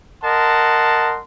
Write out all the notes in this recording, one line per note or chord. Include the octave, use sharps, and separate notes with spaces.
A#4 D#5 F#5 A5 C6